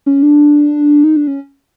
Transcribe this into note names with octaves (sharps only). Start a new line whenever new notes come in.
C#4
D4
D#4
D4
C#4